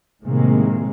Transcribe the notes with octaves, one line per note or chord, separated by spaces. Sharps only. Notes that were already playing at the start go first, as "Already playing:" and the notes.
A2 C3 D#3 G#3 A#3